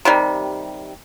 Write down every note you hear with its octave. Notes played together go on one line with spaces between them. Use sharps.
C3 D#3 G3